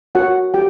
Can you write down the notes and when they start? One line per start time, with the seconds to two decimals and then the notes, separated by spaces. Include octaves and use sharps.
0.15 F#4 A#4 C#5 F#5
0.54 G4 G5